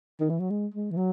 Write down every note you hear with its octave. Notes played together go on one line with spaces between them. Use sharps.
D#3
E3
F#3
G#3
G#3
E3
F#3